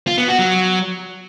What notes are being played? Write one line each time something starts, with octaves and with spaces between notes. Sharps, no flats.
F4
B3
F#4
F#3